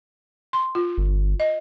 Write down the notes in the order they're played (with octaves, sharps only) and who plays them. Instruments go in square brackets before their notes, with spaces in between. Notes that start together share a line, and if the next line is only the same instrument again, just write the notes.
[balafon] C6
F4
[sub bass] G1
[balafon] D#5